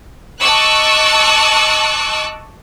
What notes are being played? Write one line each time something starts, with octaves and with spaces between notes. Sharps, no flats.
D#5 A5 C#6 D6 E6 F#6